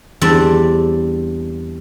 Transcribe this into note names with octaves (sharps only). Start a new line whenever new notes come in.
E2 G3 C4 D4 D5